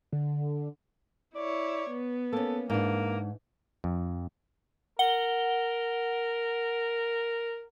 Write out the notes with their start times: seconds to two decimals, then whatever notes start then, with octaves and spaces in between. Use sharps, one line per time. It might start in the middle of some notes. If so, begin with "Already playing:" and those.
0.12 D3
1.35 E4 C#5 D5
1.90 B3
2.33 A#3 C#4 A4
2.70 G#2 E3 A#3 D4
3.84 F2
4.99 A#4 F#5 G7